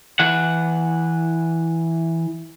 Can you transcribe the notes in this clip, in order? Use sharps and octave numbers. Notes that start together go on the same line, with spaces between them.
E3 F#5